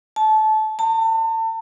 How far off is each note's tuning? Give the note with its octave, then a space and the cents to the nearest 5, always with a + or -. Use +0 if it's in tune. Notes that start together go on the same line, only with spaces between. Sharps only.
A5 -25
A5 +35